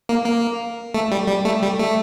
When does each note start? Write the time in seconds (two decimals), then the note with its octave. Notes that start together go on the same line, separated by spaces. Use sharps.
0.09 A#3
0.26 A#3
0.94 A3
1.11 G3
1.28 G3
1.45 A3
1.62 G3
1.79 A3